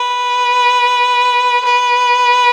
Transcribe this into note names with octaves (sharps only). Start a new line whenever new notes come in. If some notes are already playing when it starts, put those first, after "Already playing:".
Already playing: B4
B4